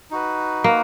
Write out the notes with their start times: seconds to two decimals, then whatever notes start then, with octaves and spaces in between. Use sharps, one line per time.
0.11 D#4 F#4 B4
0.64 A#3